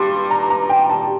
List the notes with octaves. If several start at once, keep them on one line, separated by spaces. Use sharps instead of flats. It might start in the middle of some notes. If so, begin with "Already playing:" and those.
Already playing: G2 G3 C6
A#5
A#5
G5
A5